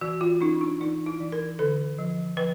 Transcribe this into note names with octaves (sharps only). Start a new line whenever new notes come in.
E3 F#4
F4
C#4 D#4
D4
E3 D#4
E4
E3
A#4
D3 A4
F3
F3 B4